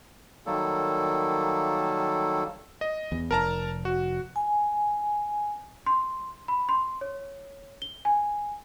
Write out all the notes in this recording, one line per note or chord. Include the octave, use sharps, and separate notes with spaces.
D#3 F#3 G3 A#3 A4
D#5
E2
F1 A#4 A5 A#5
F#4
G#5
C6
B5
C6
C#5
G7
G#5